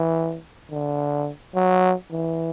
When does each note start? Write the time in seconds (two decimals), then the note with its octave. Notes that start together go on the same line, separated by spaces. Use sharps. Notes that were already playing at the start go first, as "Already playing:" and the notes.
Already playing: E3
0.71 D3
1.55 F#3
2.12 E3